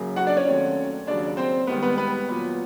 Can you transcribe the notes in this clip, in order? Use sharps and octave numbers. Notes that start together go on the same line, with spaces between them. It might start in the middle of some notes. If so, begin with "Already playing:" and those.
Already playing: F#2 C#3 F#3 A#3
F#4 F#5
D4 D5
C#4 C#5
D#2 D#3 F#3 A3 C4
D#2 C#3 F#3 D4 D5
C4 C5
G#2 D#3 G3 B3 B4
B3 B4
B3 B4
A#2 F#3 B3